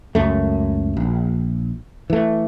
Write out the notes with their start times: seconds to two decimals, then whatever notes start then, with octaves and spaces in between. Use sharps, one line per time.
0.15 C#2 F#2 A3
0.97 A#1
2.10 E3 A3